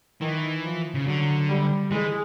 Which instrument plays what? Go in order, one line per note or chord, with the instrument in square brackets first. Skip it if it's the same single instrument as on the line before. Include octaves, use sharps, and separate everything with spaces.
[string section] D#3 [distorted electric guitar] E3
[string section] F3
[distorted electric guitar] C#3
[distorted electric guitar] D3 [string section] F#3
[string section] G3
[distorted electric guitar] E3 [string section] G#3